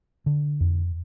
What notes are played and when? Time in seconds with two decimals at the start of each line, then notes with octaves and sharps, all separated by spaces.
0.26 D3
0.60 F2